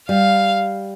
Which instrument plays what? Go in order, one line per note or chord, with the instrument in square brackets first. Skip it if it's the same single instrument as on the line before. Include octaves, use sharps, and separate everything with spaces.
[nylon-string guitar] G3 [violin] F5